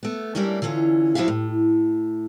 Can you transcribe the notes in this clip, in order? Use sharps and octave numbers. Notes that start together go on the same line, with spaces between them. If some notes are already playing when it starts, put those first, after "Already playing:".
A3 B3
G3 A3 A#3 C#4 D4
D3 E3 C#4 F4
F3 E4 F#4 G4 E5 F5
A2